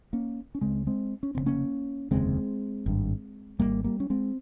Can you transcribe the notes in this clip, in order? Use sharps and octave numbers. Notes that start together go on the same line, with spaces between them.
A#3 C#4
C#4
C#2 C#3 G#3 C4
G#3 C4
C#4
F1 D#2 C#3 C4
A#3 C#4
F1 D#2 C#3 G#3 C4
G#1 G2
G#1 G2 G3 A#3
G3 A#3
C#4
G#3 C4